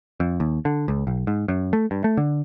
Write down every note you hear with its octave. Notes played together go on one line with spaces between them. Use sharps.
F2
D#2
D3
C#2
B1
G#2
F#2
A3
G2
A3
D3